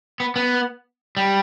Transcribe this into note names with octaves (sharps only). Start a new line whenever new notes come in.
B3
B3
G3